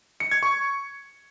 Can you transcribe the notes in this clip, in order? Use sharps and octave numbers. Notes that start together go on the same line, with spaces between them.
C#7
G#6
C#6